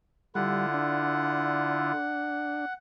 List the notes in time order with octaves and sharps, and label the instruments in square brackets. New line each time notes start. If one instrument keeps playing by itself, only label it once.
[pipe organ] D3 E4 F4 [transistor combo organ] G3 [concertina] F#5
[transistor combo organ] D4